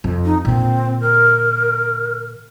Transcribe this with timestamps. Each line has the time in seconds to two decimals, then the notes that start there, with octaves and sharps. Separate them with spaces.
0.04 F2
0.25 D#4
0.45 A#2 D3 C4
1.01 A#4